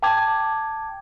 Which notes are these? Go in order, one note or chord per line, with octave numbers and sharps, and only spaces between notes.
G5 A5 D6 G#6